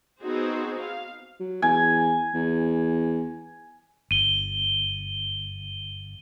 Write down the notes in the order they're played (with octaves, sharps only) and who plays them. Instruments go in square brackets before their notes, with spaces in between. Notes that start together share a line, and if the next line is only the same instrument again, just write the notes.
[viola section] B3 C4 D#4 F#4 G#4 C5
F5
[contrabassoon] F#3
[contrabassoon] E2 [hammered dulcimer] G#5
[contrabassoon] E2
[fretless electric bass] G1 [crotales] D#7 G7